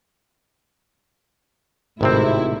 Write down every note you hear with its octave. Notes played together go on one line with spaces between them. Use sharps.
G#1 A2 C3 A3 C4 E4